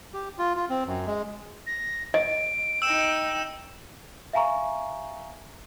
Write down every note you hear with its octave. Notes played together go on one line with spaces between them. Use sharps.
G4
F4
F4
C4
F#2
G#3
A#6
D#5 D7
D#4 G5 E6 E7
E5 F5 G#5 A#5 C#6